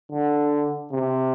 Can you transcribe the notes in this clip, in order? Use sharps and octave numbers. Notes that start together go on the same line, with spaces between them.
D3
C3